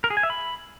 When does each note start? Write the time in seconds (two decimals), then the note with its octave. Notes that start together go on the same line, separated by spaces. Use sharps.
0.04 A#4
0.10 G#4
0.17 G#5
0.23 E5
0.30 B5